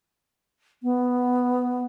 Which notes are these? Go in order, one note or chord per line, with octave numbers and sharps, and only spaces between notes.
B3